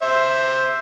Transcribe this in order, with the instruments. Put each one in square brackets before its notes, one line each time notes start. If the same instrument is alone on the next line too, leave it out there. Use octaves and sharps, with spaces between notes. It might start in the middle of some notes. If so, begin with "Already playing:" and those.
[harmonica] C5 E5